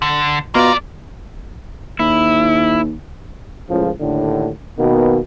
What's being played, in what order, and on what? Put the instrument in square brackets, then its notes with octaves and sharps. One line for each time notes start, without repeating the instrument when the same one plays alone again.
[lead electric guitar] D3
[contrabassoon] B2 [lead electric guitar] A#3 D5 [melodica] F4 A#5
[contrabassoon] D#2 [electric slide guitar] E4
[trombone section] C#2 A2 C#3 F3
D#2 A2 D3
B2 D#3 A#3 B3